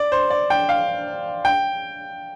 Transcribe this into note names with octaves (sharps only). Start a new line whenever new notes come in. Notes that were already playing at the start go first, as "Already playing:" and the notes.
Already playing: D5
C5
D5
G5
F5
G5